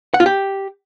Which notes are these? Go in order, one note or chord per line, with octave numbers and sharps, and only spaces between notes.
F#5
F4
G4